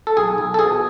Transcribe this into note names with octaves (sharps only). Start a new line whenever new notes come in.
A4
B1 G#4
B1
A4
B2 G#4